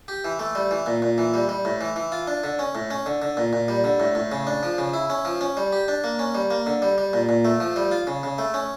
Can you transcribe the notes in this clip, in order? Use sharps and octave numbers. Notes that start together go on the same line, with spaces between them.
G4
E3
A3
G3
E3
A#2
A#2
E3
G3
G3
A2
E3
E3
F4
D4
D3
C#4
A2
C#4
D3
D3
A#2
A#2
G3
D3
A2
A2
C#3
D4
F3
C#3
E4
C#4
F3
C#4
G3
G4
D4
A#3
C#4
G3
A#3
D3
G3
G3
A#2
A#2
A3
F3
G3
F4
C#3
C#3
A3
C#4